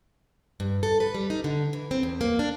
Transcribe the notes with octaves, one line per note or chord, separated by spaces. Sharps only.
G2
A4
B4
G3
D#4
D3
E3
C4
E2
A#3
D4